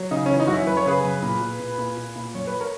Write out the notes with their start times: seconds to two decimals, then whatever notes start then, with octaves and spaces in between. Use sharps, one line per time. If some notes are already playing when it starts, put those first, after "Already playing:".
Already playing: F#3
0.11 C#3 D#4
0.26 E3 C#4
0.40 D#4
0.47 F#2 F#4
0.53 C#4 E4
0.67 F#2 B4
0.77 C#5
0.86 C#3 G#4 B4
1.04 F#2
1.23 A#2
1.42 A#2
1.60 A#2
1.79 A#2
1.97 A#2
2.16 A#2
2.35 F#2 C#5
2.47 B4
2.60 A#4 C#5